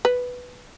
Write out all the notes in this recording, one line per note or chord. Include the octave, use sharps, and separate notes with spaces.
B4